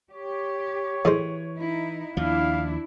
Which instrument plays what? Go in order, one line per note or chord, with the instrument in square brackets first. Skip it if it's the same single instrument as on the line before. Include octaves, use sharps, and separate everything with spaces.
[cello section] G4 [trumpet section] C#5
[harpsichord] A2 G#3 C5 [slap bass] E3
[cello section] D#4 E4
[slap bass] D#2 F3 [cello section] D4 E4 [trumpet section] F5